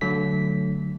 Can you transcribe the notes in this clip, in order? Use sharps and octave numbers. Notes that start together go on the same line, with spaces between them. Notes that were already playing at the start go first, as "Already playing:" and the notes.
D3 F#3 A3 B6